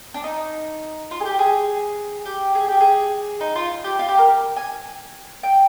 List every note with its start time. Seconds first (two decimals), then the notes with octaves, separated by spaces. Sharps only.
0.14 D4
0.24 D#4
1.11 F4
1.20 G#4
1.25 G4
1.39 G#4
2.26 G4
2.55 G#4
2.68 G4
2.80 G#4
3.41 D#4
3.55 F4
3.84 G4
3.99 F4
4.08 G4
4.18 A#4
4.57 G#5
5.43 G5